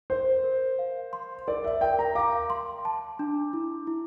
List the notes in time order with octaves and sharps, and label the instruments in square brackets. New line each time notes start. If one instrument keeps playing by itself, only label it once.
[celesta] A#4 [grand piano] C5
[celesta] A#4
F5
C6
[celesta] A#4 [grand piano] D5
[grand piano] E5
[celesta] A#4 [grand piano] G5
[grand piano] A#5
[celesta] F5 [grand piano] D6
[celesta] C6
A5
D4
E4
E4